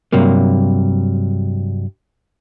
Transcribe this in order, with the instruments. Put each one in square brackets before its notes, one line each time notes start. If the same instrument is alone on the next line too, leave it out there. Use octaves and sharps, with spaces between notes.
[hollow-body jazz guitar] G2 C3 F#3 A#3